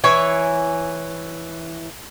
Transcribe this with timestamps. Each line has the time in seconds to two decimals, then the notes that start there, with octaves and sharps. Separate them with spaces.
0.04 E3 C#5 G#5